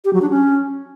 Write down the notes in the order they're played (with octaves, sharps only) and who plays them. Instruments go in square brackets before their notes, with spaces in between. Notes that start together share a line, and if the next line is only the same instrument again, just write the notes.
[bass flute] G4
F#3
D4
C#4